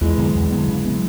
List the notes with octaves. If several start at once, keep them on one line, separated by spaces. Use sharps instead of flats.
E2 E3 G#3
D3 F#3 B3
E2
D3 F#3 B3
C#3
F#3 B3